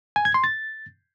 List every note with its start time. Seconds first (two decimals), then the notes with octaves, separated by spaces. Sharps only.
0.16 G#5
0.25 G#6
0.34 C6
0.44 A6